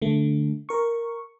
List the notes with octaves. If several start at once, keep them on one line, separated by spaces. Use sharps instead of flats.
D3 A3
A#4 C#6